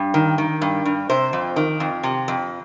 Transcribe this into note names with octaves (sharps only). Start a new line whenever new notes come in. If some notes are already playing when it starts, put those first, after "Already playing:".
Already playing: G2
D#3
D#3
G2
G2
C3 C5
F2
D#3
F2
C3
F2